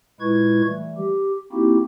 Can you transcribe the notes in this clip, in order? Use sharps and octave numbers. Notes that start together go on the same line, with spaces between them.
A#2 G#3 E4 B4 C#6 G#6
E3 G3 A3
G4
A#3 C4 D#4 E4 F#4 G4